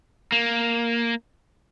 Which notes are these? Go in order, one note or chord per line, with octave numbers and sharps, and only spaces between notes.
A#3